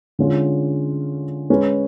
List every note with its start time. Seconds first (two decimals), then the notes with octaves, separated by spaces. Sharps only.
0.19 D3 G#3 C#4 F4 G#4
1.50 G#3 C#4 G#4 B4